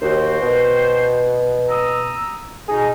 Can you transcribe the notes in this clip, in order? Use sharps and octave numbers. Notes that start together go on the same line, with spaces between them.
D#2 F#4 C5 G5
B2
A#5 D#6 E6
B2 D#4 G#4